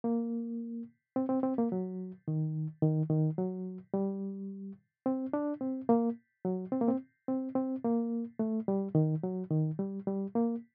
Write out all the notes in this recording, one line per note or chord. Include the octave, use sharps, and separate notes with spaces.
A#3
C4
C4
C4
A#3
F#3
D#3
D#3
D#3
F#3
G3
C4
D4
C4
A#3
F#3
C4
A#3
C4
C4
C4
A#3
A3
G3
D#3
F#3
D#3
G3
G3
A#3